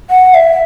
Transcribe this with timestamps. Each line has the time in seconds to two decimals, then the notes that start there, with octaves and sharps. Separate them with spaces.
0.10 F#5
0.34 E5